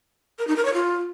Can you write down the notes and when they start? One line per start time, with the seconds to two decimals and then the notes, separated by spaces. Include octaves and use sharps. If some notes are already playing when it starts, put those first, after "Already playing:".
0.39 A#4
0.47 D#4
0.56 A#4
0.65 C#5
0.74 F4